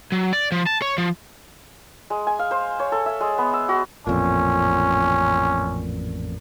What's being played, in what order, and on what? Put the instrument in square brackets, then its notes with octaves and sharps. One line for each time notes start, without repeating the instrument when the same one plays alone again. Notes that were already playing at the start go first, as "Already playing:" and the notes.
[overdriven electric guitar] F#3
D5
F3
A5
C#5
F3
[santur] G#3
G#5
F5
C5
C#5
A4
E5
G#3
B3
E6
F#4
[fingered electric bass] A1 F2 A#2 [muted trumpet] C#4